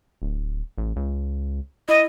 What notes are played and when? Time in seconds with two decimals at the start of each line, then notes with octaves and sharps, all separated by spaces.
0.22 D1
0.78 A1
0.96 C#2
1.89 E4 D#5